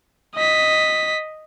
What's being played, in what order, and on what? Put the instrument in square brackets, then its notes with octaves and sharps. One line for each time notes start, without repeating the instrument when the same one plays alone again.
[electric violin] D#5 B6